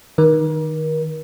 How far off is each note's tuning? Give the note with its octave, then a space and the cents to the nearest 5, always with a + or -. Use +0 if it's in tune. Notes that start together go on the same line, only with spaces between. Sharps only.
D#3 -10 A#4 +35